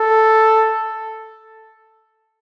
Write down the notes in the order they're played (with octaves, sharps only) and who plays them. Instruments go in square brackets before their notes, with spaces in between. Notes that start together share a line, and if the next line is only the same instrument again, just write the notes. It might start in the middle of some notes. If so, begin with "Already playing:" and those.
Already playing: [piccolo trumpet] A4